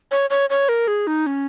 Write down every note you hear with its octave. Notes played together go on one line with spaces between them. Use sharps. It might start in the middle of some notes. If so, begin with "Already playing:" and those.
C#5
C#5
C#5
A#4
G#4
D#4
C#4